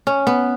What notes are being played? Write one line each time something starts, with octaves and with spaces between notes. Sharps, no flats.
C#4
B3